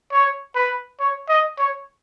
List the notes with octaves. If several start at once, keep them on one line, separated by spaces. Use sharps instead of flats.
C#5
B4
C#5
D#5
C#5